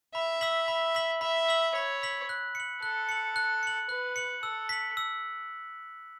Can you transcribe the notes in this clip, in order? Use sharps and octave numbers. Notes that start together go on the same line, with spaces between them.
E5 B5
E6 B6 F#7
B5
E6 B6 F#7
E5 B5
E6 B6 F#7
C#5 B5
E6 B6 F#7
F#6
C#7 F#7
A4 F#6
C#7 F#7
F#6
C#7 F#7
B4 F#6
C#7 F#7
A4 E6
B6 F#7
E6